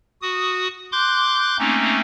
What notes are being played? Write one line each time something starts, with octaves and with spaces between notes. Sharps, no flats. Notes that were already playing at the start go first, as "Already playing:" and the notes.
F#4 D#6
C6 D6 F#6 G6
A3 A#3 C4 C#4 D#4